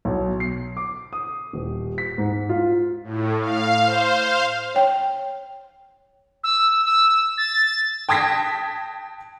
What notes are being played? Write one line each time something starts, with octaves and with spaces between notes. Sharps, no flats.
B1
C7
D6
D#6
D#1
B6
G#2
F4
A2
F5
C5
F5
C#5 G5
E6
E6
A6
G5 A5 D#6 G#6 A#6 B6